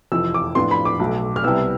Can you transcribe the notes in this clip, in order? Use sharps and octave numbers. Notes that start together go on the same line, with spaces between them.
F1 F2 E3 E6
D6
A2 F3 B3 D4 F4 C6
B5
D6
B1 B2 A3
F6
C2 C3 G3 B3 E4 E6